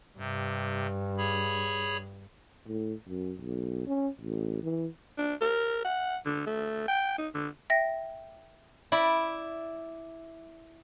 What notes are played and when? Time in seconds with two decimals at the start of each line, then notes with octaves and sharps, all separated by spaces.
0.18 G2 C3
1.18 G#4 C#5 B5
2.67 A2
3.08 F#2
3.40 B1
3.87 C#4
4.21 A1
4.63 E3
5.18 D4
5.41 A#4
5.85 F#5
6.26 D3
6.46 A3
6.88 G5
7.18 D#4
7.34 D3
7.70 E5 G5 A#6
8.92 E4 D5 B5